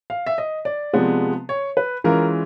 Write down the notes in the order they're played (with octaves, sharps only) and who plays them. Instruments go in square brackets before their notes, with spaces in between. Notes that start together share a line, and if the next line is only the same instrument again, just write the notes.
[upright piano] F5
E5
D#5
D5
C3 F3 G#3 B3
C#5
B4
E3 G#3 C#4 F4 A#4